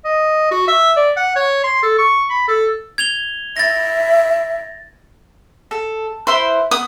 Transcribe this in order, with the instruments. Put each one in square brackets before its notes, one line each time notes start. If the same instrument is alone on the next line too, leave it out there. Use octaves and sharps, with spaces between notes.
[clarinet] D#5
F#4
E5
D5
F#5
C#5
C6
A4
C#6
B5
A4
[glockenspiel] G#6 F7 G7
[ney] E5 [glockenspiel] A6 A#6
[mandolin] A4
[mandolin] E4 B4 C5 [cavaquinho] C6
[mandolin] B3 [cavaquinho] D#6